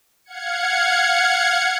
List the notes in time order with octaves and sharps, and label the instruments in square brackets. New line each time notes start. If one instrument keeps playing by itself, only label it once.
[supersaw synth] F5 F#5 G#6 C#7